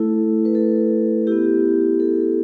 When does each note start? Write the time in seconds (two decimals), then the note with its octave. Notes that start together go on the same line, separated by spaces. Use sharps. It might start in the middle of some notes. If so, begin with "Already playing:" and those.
Already playing: A3 E4 A4
0.45 B4
0.55 A4
1.27 B3 E4 G4
2.00 A4